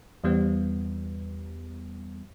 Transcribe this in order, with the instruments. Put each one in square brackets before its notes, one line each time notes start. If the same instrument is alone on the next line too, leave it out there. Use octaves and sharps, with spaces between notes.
[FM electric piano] E2 E3 G3 B3